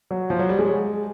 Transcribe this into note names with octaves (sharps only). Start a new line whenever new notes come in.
F#3
F3
F#3
G3
G#3